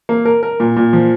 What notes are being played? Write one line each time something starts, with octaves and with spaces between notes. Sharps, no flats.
A#3
A#4
A#4
A#2
A#2
F3